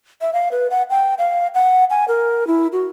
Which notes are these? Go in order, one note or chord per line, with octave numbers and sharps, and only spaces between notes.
E5
F5
B4
F#5
G5
F5
F#5
G#5
A#4
E4
F#4